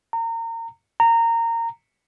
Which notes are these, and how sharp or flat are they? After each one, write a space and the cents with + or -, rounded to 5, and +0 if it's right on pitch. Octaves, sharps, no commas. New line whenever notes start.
A#5 -30
A#5 -20